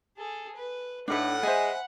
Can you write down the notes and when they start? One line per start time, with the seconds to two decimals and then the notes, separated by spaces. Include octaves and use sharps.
0.17 G#4 A4
0.56 B4
1.08 A2 D4 D#4 B4 F#5 B5
1.43 G#3 C5 E5 G#5